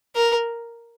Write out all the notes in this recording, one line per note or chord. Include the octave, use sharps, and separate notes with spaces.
A#4